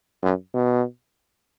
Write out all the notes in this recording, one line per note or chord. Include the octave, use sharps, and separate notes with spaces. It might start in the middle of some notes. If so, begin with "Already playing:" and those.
F#2
B2